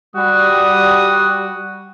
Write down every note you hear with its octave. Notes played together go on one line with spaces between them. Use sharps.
G3 F#4 D#6